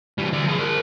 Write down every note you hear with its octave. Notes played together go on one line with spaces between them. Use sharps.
E3 G3
D2 D5
F3 G#4
A#4 C5